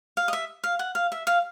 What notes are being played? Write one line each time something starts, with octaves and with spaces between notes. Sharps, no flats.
F5
D#5
E5
F5
F#5
F5
E5
F5